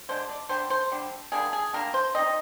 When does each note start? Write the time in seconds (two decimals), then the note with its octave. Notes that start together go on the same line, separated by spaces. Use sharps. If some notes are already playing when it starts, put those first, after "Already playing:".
0.09 D3 G#3 D4 C5
0.29 D5
0.49 D3 G3 D4 C5
0.70 C5
0.92 D3 G3 D4
1.32 D3 G3 A#3 D4 G#4
1.53 G#4
1.73 D3 G3 A#3 D4 A#4
1.94 C5
2.14 G3 C4 D#4 D#5